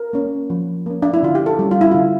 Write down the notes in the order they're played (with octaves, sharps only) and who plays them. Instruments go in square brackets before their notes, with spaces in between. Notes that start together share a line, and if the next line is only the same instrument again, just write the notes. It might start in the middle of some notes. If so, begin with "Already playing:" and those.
Already playing: [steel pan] A#4
A#3 C#4
F3
A#3 C#4
D4
E4
D3 F4
G4
A4
G3 C#4
F4
E4
D3 F4